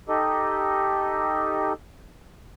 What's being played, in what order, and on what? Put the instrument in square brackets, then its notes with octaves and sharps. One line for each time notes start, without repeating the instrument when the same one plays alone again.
[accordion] D#4 G4 A4 D#5